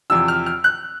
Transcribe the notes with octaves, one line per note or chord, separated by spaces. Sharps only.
E2 C3 F3 E6
F6
F6
F#6